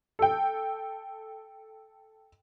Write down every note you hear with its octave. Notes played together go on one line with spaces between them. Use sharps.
A4 G5